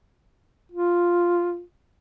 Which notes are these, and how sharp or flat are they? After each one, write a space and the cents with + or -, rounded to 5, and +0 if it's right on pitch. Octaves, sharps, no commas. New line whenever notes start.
F4 +0